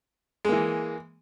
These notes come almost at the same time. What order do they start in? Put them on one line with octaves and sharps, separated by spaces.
G#3 A#3 E3